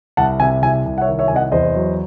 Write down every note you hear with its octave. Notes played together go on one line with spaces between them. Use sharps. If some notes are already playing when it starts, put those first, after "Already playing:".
C2 F#5 A5
C3 E5 G#5
C2 E5 G#5
C2
F#5
C#5 E5
D#3
C#5 E5
C2 G#5
D#5 F#5
E2 C5 D#5
F#3